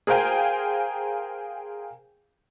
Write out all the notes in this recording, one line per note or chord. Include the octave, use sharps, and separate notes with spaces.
G#4 A#4 C5 F5 G5 G#5